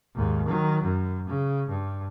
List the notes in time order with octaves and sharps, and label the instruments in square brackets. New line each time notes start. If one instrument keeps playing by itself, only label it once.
[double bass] D#2 G#2
D#3 F#3
F#2
C#3
G2